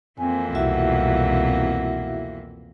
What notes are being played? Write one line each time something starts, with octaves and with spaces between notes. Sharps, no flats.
F2 E3 A#3 C4 G#5
C2 B2 E4 F#4 E5 F#5